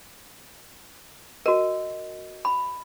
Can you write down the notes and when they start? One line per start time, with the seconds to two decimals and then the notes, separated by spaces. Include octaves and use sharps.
1.46 F#4 A#4 D#5
2.45 B5